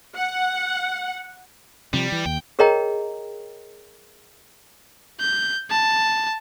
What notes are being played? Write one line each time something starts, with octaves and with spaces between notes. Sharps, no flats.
F#5
C3 F3 G3
E3
D#2 G5
G#4 A#4 C#5 D#5 G5 A#5
G6
A5